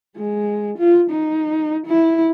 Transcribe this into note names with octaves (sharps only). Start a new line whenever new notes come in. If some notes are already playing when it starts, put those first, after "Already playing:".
G#3
F4
D#4
E4